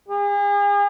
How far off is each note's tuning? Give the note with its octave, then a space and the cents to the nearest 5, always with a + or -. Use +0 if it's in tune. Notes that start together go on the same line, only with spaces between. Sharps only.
G#4 -40